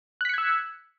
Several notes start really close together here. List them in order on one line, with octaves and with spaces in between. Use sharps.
F#6 B6 C#7 G#6 E6